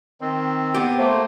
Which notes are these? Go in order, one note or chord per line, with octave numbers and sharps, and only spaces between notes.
D#3 C4
B3 G4
A3 A#3 C5